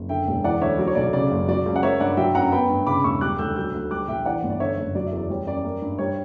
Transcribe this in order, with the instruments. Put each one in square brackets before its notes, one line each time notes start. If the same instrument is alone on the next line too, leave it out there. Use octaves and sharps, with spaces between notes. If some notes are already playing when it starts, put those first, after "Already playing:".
Already playing: [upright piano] F#1
D3 E5 G5
E1
E3 D5 F#5
D2 C#5 E5
F#3 D5
C#5
B1 D5
C#3 D5
F#1
F#3 D5
C#2
F#5
A#3 C#5 E5
G2 D5 F#5
F#3 E5 G5
F#2 F#5 A#5
B3 G5 B5
G2
C#3 B5 D6
E1 C#6 E6
G3 D6 F#6
D2 E6 G6
F#3 E6 G6
D2
G3 D6 F#6
A#1 E5 G5
E3 D5 F#5
G1
D5
D3 C#5 E5
F#1
F#3 D5
E5
E2
D5
G3 C#5
F#2 D5
A#3
G2
G3 C#5